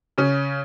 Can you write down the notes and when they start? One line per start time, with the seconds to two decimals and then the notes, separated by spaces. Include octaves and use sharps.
0.18 C#3 C#4